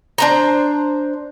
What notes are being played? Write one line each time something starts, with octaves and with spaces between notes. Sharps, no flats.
D4 C5 A#5